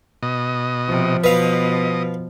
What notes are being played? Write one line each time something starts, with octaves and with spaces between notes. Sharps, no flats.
B2 D#5
C3 F3
B2 B4 D#5 F5